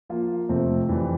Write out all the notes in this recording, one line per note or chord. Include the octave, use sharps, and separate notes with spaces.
F3 A#3 F4
F2 C3 F3 A3 C4
F2 E3 G3